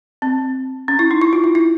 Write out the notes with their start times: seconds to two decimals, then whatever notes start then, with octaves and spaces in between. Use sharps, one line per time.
0.22 C4
0.88 C#4
0.99 E4
1.11 D#4
1.21 E4
1.33 F4
1.44 E4
1.55 E4